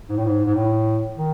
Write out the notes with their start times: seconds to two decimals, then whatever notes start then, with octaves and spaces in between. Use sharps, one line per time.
0.09 G#2
0.17 A2
0.25 G#2
0.44 G#2
0.55 A2
1.18 D#3